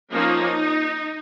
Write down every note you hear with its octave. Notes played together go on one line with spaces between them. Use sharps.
F3 A#3 C#4 D#4